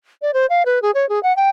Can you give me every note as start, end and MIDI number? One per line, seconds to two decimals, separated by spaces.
0.22 0.33 74
0.34 0.46 72
0.50 0.65 77
0.66 0.81 71
0.82 0.91 68
0.94 1.08 73
1.09 1.22 68
1.23 1.35 78
1.36 1.49 79